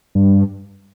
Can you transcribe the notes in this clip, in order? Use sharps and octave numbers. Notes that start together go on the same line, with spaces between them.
G2